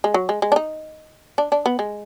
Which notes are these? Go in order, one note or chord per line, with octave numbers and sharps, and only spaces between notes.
G#3
F#3
G#3
G#3
D4
D#4
D4
D4
B3
G#3